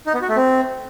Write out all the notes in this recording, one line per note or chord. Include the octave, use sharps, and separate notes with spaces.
D#4
B3
F#4
A3
C4